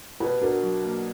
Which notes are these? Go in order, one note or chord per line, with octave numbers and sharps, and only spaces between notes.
B2 G4 B4
D4 F#4 A#4
F#3
A#3